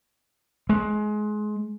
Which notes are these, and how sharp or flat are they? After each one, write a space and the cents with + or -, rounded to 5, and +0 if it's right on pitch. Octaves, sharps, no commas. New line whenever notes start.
G#3 +25